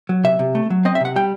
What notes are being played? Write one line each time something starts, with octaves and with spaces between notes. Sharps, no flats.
F#3
C3 E5
C3
A3
F#3
C4 D#5
E5
C3 F#5
G3 G5